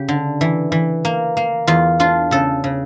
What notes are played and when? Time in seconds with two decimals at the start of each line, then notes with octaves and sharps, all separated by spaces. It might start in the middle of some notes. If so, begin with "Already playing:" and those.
Already playing: C#3 G4
0.09 D3
0.41 E3
0.72 E3
1.05 A#3
1.37 A#3
1.67 E2 F4
2.00 D4 F4
2.31 C#3 A4
2.64 C#3